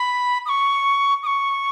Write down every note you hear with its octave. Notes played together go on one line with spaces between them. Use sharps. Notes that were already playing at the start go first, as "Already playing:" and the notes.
Already playing: B5
D#6
C#6
D#6
C#6